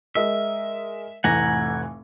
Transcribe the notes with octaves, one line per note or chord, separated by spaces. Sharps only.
G#3 A#4 D#5 E5
F1 A2 E3 F#5 G#5 A#5